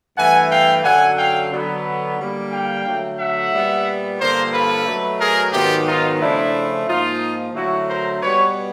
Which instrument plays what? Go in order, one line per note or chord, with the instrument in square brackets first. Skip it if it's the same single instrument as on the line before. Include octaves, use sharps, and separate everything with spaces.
[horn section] G2 E3 A3 F#5 G#5
F5 G5
F#2 D3 F#3 F#5 G#5
F5 G5
D3 F#3 B3
D3 G3 A#3
F5 G5
D3 F#3 A3
E5 F#5
A#2 G3 B3
G2 D3 F3 A#3 A#4 C5
A4 B4
B2 F#3 A3
G#4 A#4
G#2 D#3 F#3 B3 F4 G4
D#4 F4
C#3 F3 A3 D4 E4
G#2 F3 A#3 D#4 F4
D3 F#3 A3 E4 F#4
A#4 C5
B2 G3 B3 B4 C#5